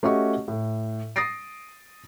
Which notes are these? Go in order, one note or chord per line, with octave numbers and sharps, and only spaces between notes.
A3 C#4 F#4 G4 D#5 C#6
A2
D#6 A6 A#6 C7 D7